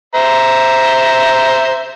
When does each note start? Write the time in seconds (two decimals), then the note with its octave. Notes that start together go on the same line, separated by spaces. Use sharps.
0.15 C5 E5 A#5